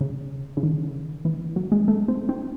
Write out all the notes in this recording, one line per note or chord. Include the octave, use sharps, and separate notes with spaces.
C#3
C#3
D#3
E3
F#3
G#3
A3
C4
C4